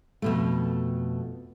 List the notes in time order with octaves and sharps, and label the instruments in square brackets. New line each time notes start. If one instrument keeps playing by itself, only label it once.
[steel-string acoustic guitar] F2 B2 A3